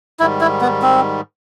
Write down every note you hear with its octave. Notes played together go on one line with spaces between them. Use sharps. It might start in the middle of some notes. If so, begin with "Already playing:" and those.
G#2 D#3 G3 E4
E4
B3
C4